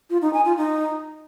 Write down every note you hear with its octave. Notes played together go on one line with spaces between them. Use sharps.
F4
D#4
G#5
F4
D#4